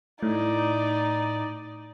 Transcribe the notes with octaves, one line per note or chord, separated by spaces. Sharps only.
A2 D#4 D5